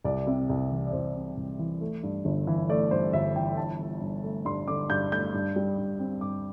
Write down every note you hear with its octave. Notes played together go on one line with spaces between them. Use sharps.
C2 D5
C3
C2
E3
D5
C2 C5
C3
C2
E3
A3
G2
G1
E3
A3 D5
G2 C5
G1 E5
E3 G5
G2 A5
D3
G2
A3
G2 C6
D3 D6
G2 G6
A3 G6
G2
G3
G2
C4
G2 D6